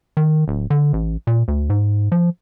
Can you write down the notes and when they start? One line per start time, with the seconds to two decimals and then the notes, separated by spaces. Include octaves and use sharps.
0.17 D#3
0.48 D1
0.70 D3
0.93 A1
1.27 A#2
1.48 D2
1.70 G#2
2.12 F3